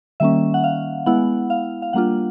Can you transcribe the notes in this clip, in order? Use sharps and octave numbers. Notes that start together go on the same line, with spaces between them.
D#3 G3 A#3 C#4 E5
F#5
F5
G#3 B3 E4 F#5
F5
F5
G3 A#3 D4 F4 F#5